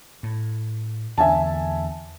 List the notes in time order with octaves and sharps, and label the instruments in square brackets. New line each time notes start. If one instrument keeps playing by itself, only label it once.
[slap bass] A2
[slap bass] E2 D3 [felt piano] E5 G#5 A5